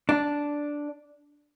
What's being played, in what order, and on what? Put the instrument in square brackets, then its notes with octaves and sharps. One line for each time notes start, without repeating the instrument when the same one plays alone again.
[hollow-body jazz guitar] D4